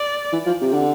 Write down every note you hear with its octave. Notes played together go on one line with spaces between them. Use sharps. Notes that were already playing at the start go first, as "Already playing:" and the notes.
Already playing: D5
E3
F3
C3
D3